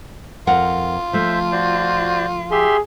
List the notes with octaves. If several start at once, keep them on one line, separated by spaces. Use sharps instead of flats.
F2 F4 A#4 F#5
F3 A3 C5 E5
F#4 C5 D5
G4 G#4 E5 C6